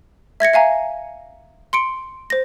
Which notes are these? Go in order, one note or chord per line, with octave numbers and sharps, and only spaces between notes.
E5 G#6 A#6 C#7
E5 F5 G#5 A#5
C6 C#7 D7
C5 A#6